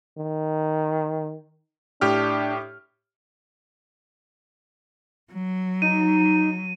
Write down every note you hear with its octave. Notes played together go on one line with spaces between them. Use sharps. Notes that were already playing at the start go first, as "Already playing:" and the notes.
D#3
A2 D4 G4 F6
F#3
D#4 D#7